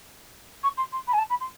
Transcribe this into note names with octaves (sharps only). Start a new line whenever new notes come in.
C#6
C6
C6
B5
G#5
A5
B5
C6